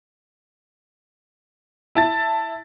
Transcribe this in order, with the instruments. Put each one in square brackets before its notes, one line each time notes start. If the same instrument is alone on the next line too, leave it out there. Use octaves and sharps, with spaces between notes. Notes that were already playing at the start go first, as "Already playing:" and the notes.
[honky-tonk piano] E4 A5 A6